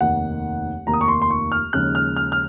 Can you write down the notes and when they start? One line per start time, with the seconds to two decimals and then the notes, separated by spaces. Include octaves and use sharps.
0.01 F1 D#2 D#3 A#3 F#5
0.86 F1 D#2 D#3 A#3 A#5
0.94 D#6
1.01 C#6
1.08 C6
1.22 C6
1.30 C#6
1.52 F6
1.73 D#2 C#3 F3 G#3 F#6
1.95 F6
2.16 F6
2.32 F6